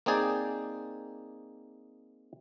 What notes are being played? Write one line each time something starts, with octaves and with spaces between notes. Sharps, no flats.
A#3 C4 D#4 G#4 D5 G5